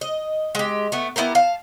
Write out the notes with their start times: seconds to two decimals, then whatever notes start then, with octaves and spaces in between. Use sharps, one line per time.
0.01 D#5
0.55 G#3 G4
0.92 A3 B3
1.16 B3 E4 G4 A#4
1.35 F5 A5